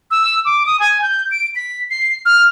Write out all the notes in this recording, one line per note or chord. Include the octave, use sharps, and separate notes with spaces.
E6
D6
D#6
G#5
G6
D7
B6
C7
F6